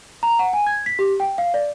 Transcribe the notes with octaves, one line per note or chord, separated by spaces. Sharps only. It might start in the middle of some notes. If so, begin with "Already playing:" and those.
A#5
F#5
G#5
G#6
B6
G4
G5
F5
D5